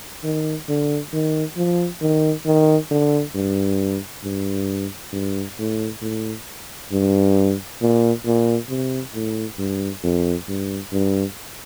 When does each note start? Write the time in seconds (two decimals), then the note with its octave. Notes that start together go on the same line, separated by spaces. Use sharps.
0.24 D#3
0.69 D3
1.13 D#3
1.57 F3
2.02 D#3
2.46 D#3
2.91 D3
3.35 G2
4.24 G2
5.13 G2
5.59 A2
6.02 A2
6.92 G2
7.81 A#2
8.26 A#2
8.69 C3
9.14 A2
9.59 G2
10.04 F2
10.48 G2
10.93 G2